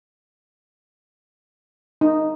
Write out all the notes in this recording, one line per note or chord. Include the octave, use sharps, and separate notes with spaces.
D#4